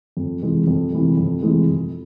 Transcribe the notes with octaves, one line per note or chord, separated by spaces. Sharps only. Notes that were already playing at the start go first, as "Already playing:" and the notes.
F2
C3 E3 G#3
F2
C3 E3 G#3
F2
C3 E3 G#3
F2